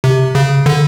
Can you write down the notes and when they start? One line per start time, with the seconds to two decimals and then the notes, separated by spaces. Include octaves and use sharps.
0.04 C3
0.35 C#3
0.66 D3